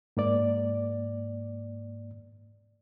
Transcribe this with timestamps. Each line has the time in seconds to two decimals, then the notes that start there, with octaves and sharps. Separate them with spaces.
0.17 G#2 A#3 D5